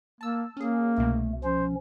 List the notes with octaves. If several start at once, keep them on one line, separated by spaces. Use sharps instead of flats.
A#3 A5 E6
A#3 C#4 G#4
C2 B2 A3
F3 C#4 C5